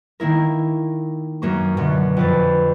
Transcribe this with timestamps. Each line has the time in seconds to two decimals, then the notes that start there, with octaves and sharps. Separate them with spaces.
0.20 D#3 A#3 E4 A#4
1.42 F#2 A#3 C#6
1.77 F#2 B2 D3
2.17 F2 B4 A6